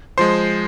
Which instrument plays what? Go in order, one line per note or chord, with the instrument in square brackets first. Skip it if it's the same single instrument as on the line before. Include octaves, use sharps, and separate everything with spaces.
[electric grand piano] F3 G#3 C5 C6